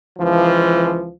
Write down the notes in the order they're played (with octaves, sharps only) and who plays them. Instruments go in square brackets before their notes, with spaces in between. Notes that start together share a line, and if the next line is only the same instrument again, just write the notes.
[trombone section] C#2 E3 F3